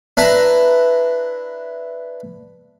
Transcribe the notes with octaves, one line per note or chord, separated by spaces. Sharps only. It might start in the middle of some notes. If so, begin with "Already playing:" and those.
D4 E4 B4 A#5